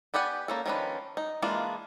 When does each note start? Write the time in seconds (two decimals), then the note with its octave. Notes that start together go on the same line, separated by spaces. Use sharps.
0.14 B3 G4 D5 F#5 G#5
0.48 A#3 C#4 A4
0.66 D#3 F3 C#4 D4 B4
1.17 D#4
1.42 E3 G#3 A#3 D4 F4